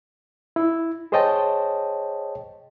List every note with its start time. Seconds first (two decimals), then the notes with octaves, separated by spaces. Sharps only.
0.56 E4
1.12 G#4 C5 C#5 D#5 G5 A5